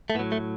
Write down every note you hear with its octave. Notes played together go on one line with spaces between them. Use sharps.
A3
A2 F#3 B3
A3